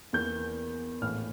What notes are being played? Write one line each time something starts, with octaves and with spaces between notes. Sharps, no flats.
E2 E3 A#3 G6
A#1 A2 E3 F6